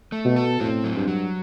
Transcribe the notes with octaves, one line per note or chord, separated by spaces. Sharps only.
A3
B2
A4
A2 C4
F#3
G2
F#3